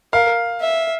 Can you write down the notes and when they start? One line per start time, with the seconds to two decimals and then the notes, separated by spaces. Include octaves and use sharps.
0.13 A#4 F5
0.61 E5